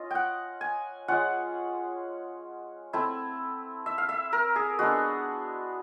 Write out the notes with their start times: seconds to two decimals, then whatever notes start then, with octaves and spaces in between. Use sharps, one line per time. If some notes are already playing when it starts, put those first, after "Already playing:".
Already playing: C#4 F4 D#5
0.11 F#5 G5
0.61 G#5
1.08 G#3 C#4 F4 F#5
2.93 A3 C4 E4
3.86 E5
3.98 F5
4.09 E5
4.33 A#4
4.56 G#4
4.79 G#3 B3 D4 F#4